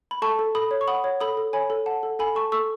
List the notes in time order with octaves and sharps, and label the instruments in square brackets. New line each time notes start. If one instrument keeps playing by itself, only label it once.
[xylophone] B5
A4 A5 C#6
A4
A4 B5 D#6
C#5
C#6
F#5 B5 D#6
C#5
A4 B5 D#6
A4
C#5 G#5 B5
A4
F#5 A5
A4
A4 G#5 B5
A4 A5 C#6
A4 C#6 E6